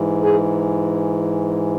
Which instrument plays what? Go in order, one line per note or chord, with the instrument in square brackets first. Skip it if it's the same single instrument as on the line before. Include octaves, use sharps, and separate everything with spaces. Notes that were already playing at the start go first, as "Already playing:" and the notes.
Already playing: [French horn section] G#2 E3
G#4